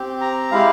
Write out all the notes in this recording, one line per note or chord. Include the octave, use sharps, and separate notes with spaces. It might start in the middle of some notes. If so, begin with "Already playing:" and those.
Already playing: C4 G4
A#5
G#3 E4 G4 F5